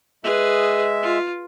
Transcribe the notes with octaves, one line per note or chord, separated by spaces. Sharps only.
G#3 G#4 B4 E5
F4